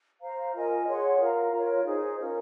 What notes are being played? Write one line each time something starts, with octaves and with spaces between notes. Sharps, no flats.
C5 F5 A#5
F4 A#4 D#5 G#5
G#4 C#5 F#5 C6
F4 A#4 F5 A#5
F4 A#4 C#5
D#4 G#4 C5
C#4 F4 A#4